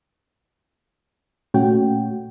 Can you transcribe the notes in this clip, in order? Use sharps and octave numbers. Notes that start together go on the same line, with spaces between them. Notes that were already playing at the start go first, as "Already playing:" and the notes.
A#2 A3 C#4 F#4 G5